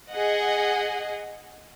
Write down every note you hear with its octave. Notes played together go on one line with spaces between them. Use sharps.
G#4 D#5 F#5